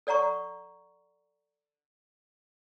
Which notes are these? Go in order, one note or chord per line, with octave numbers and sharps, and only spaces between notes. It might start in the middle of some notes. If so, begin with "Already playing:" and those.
A4 D5 F#5 A#5 C#6